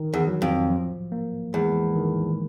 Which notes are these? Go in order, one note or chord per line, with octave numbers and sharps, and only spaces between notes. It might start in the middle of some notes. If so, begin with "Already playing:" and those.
Already playing: D#3
E2
F#3
F2
F3
A#3
E2 G#3
D#3